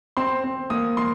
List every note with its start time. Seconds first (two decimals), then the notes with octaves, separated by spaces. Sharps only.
0.17 C4 C6
0.44 C4
0.70 A#3 D#6
0.97 A#3 C6